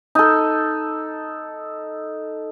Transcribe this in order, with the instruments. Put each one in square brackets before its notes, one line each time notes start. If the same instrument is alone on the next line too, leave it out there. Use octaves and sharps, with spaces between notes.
[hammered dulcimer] D#4 A4